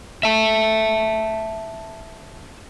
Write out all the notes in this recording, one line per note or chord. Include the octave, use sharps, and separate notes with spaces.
E5 A5